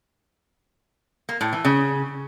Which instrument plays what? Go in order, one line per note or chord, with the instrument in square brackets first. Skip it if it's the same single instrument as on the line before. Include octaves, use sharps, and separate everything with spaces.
[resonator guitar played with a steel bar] A#3
A2
E3
C#3